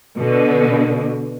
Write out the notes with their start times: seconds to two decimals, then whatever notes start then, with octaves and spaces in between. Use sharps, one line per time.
0.16 B2 D3